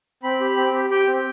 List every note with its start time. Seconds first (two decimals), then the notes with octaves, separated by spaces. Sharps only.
0.23 C4 B5
0.40 G4
0.57 C4
0.73 G4
0.90 G4 G5
1.07 C4